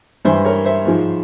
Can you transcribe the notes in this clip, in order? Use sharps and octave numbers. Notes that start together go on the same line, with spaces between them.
G2 E3 C5 E5
A#4 C#5
C5 E5
G#2 F3